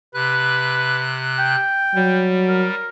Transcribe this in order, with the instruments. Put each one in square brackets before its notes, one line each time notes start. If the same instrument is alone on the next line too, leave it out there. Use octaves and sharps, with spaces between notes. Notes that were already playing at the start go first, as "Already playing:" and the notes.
[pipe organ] C3 F#6 [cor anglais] B4
[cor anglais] G5
[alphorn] F#3 [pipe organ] G3
[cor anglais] A#4